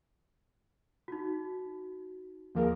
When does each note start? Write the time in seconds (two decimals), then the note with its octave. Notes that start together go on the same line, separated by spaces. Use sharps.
1.08 D#4 F#4
2.55 D#2 F3 A#3 G#4 A#4